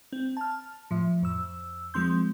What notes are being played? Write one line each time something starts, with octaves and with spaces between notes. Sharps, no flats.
C4
A5 F6
A2 F3
F2 E6
F3 G#3 C4 C6 G6